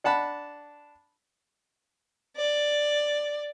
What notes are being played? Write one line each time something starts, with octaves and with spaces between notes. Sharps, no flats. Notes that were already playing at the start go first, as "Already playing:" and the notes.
D4 F#5 A5 B5
D5